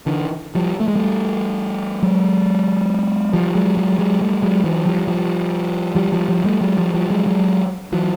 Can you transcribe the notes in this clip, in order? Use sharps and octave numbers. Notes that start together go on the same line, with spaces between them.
D3 E3
F3 G3
A3
G#3
G3 A3
F#3 G#3
F3 G3
F#3 G#3
F#3 G#3
F#3 G#3
G3 A3
F#3 G#3
E3 F#3
F3 G3
F3 G3
F3 G3
F3 G3
F3 G3
G3 A3
F#3 G#3
F3 G3
F3 G3
F#3 G#3
F#3 G#3
E3 F#3